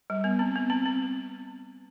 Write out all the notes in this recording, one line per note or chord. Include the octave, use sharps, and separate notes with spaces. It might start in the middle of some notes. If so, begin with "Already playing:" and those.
G3
B3
C4
B3
C4
C4